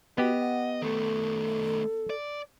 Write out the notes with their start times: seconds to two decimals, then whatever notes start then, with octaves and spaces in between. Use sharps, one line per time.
0.18 B3 F#4 G4 D#5
0.39 F#5
0.82 D#3 A3 A4
2.10 D5